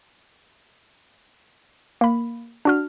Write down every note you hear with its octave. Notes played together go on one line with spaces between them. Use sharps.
A#3 B5
D4 F#4 F6